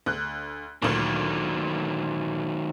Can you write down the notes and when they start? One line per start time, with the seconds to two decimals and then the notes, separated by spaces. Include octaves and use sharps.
0.06 D2 F#6
0.82 D2 A#2 D#3 F#3